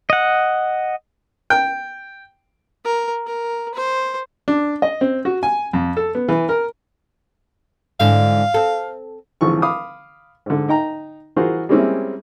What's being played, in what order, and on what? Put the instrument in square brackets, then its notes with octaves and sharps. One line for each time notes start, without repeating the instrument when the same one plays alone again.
[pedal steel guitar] D#5 F#5
[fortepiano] G5
[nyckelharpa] A#4
A#4
C5
[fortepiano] D4
D#5
C4
F#4
G#5
F2
A4
B3
E3
A#4
[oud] G#2 D3 E3 [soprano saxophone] F5
[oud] C4 A4
[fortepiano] G#1 D3 E3 F3 G#4 C#6
F5 B5 D6 D#6
G#2 D3
D#4 G5 A#5
E3 F4 F#4 G#4 A#4 C5
G3 G#3 A#3 C4 C#4 E4